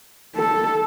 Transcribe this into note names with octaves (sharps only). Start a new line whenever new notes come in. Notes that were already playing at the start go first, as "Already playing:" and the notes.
A4